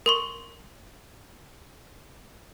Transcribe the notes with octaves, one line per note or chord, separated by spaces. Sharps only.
A#4 C6 C#6